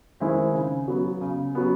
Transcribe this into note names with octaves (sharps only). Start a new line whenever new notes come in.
D#3 G#3 C4 E4
C#3
F#3 B3
C#3
F#3 B3